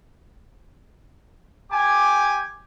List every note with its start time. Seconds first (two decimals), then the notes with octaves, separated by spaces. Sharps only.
1.71 G4 G#5 D6